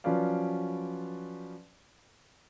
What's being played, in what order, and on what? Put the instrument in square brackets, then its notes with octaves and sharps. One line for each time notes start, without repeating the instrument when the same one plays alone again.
[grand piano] F3 F#3 C#4 B4 D5 F5